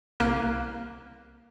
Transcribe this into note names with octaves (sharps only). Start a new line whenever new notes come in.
C2 A#3 F6 F#6